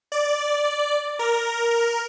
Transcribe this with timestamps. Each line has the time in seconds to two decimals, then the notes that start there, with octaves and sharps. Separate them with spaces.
0.12 D5
1.19 A#4